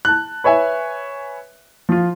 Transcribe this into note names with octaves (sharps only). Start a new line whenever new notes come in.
A5 F#6
B4 C#5 E5 G#5
F3 F4